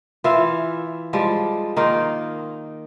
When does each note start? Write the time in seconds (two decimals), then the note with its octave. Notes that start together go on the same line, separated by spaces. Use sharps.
0.24 E3 F4 E5 F5
1.13 F3 G3 G#3
1.76 D#3 A#3 D#4 F4